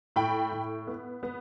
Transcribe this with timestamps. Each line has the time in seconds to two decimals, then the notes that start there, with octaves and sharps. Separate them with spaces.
0.16 A2 G5 B5
0.52 A2
0.87 B3
1.23 B3